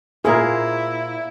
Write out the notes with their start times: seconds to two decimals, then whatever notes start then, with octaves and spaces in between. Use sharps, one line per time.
0.25 A#2 A#3 E4 G#4 A#4 C5